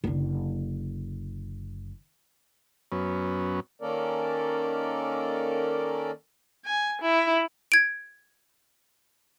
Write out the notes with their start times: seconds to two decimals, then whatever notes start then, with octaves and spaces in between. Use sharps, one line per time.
0.04 F#1 D3
2.92 F#2 B3 C#4
3.82 D#3 A#3 C#4 A4 A#4 D5
6.65 G#5
7.02 E4
7.72 G#6 D7